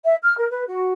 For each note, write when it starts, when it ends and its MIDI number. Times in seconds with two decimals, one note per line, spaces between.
0.04 0.15 76
0.22 0.35 89
0.37 0.49 70
0.49 0.65 71
0.67 0.93 66